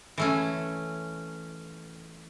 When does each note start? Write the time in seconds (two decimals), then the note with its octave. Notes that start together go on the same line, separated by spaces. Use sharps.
0.18 E3 A3 C#4